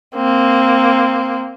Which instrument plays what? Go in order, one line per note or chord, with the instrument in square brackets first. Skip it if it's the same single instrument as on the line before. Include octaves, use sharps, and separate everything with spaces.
[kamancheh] A#3 C4